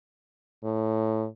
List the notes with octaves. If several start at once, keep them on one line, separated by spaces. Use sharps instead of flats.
A2